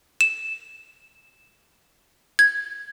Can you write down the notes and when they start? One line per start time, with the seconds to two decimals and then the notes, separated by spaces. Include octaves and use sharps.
0.21 E7
2.39 G#6